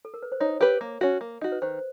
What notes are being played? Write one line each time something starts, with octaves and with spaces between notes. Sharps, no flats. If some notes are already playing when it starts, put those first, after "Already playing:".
A4
A#4
B4
C5
D#4 C#5
G4 A#4 B4
A#3
C#4 F#4
A#3
D#4 F#4
B4
D#3 C5